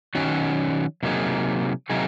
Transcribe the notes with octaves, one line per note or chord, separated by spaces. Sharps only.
D#3 F#3 C#4 F#4
C3 F#3 A#3 D#4 G#4
C3 F#3 A#3 D#4 G#4